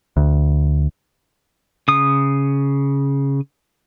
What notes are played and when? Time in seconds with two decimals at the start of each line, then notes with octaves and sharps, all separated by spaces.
0.17 D2
1.88 C#3 D#6